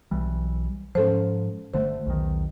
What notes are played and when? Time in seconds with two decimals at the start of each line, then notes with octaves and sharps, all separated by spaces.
0.11 B1 E3 G3
0.95 G#2 F3 C#4 A4 C5
1.74 G1 D3 A3 C5
2.06 B1 E2 D#3